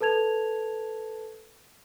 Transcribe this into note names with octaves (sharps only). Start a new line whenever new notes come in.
A4 B4 A5 G#6 F7